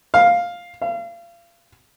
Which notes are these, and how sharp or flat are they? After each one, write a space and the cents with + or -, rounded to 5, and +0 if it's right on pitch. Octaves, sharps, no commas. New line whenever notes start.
F5 +5
F5 -35